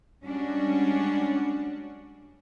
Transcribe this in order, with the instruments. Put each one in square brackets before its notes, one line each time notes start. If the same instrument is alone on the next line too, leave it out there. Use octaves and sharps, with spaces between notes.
[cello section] G3 G#3 C#4 D4 F#4